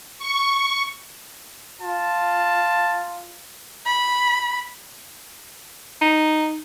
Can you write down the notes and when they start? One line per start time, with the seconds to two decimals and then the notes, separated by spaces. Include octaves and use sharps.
0.19 C#6
1.82 F4 A5
3.86 B5
6.01 D#4